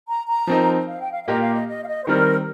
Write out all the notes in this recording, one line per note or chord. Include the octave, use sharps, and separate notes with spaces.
A#5
A#5
F3 C4 D#4 A#4
F5
G5
F5
F5
A#2 A#3 G4 A#4 D#5
F5
D#5
D#5
F5
D#5
C5
D#3 G3 C4 A#4